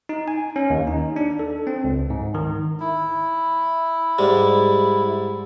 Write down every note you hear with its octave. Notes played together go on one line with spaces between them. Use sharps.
D#4
G#5
C#4
D#2
D#4
D4
A4
C4
C#2
G#2
D#3
E4
G#2 G3